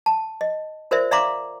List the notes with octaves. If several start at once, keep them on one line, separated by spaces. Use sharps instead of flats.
A5
D#5
F4 A#4 C5 D5 E5
D5 E5 F5 A#5 C6 D6